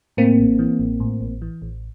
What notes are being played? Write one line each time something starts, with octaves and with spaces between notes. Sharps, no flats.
A2 A#3 C4
A1
E3
A1
A2
A1
E3
A1